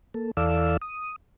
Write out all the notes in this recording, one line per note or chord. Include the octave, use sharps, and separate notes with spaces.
A#3 A4
E2 E3 A4 D5 F5 E6
D#6